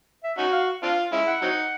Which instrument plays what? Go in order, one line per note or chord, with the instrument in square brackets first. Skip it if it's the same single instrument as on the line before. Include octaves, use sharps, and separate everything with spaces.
[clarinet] E5
[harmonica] C#4 D#4 F#4
[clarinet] F5
[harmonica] C4 D4 F4 [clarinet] F5
[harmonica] G#3 C#4 E4
[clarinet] F#5
[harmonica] F#3 C4 D#4